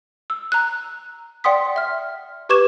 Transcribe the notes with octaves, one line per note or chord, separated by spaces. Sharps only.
E6
A#5 F#6
D5 F#5 G5 C6 D#6 B6
E5 F6
G4 B4 C#6 D6 G#6 E7